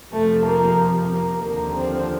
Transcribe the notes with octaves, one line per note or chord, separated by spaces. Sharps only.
F2 C3 F3 A3
A#3
A#3
D#2 D3 F3 A#3
C4